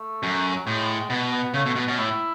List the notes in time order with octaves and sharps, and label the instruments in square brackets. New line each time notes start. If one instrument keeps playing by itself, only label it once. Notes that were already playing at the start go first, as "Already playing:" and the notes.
Already playing: [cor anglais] A3
[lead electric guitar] F#2
[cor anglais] F#3
[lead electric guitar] A2 [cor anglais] G#3
[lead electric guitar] B2 [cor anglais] B3
[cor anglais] B3
[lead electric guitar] C#3 [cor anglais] A3
[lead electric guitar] B2 [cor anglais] A3
[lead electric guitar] B2 [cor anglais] B3
[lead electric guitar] B2 [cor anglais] C#4
[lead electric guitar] A2 [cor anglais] E4